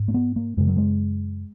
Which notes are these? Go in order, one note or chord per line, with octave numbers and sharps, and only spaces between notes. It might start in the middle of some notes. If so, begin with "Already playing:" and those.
Already playing: G#2
A#3
B3
A#3
F#2 C#3 G#3
F#3
G#3